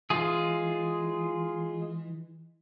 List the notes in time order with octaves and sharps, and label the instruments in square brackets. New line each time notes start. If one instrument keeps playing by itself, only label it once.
[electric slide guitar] E3 [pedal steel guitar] G#3 F4 G#4